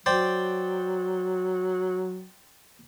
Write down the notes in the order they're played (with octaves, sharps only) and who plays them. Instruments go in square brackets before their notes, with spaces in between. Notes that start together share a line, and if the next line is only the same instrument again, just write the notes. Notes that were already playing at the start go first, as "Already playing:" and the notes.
[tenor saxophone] F#3 [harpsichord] C5 D5 G5